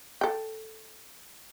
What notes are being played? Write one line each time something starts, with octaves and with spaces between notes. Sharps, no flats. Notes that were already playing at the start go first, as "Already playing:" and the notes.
A4 G5